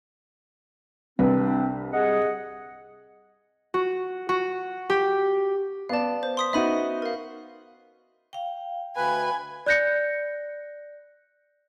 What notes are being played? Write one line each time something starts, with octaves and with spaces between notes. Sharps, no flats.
C2 C4 D4 B4
G#4 D#5 F#5
F#4
F#4
G4
B3 D5 F5 A5
C5
C6 D#6 B6
B3 D#4 F#4 E5 B5 D#7
A#4 F5
F5 G5
D2 B4 G#5 B5
D5 F#6 G6 A#6 C#7